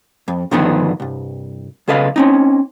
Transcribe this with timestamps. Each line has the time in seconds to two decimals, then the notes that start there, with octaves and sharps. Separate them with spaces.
0.28 F2
0.51 G2 D3 D#3 F3 B3 D#4
1.00 C2 G2
1.88 B1 C#3 A4 B4 D#5 F5
2.16 C4 C#4 D#4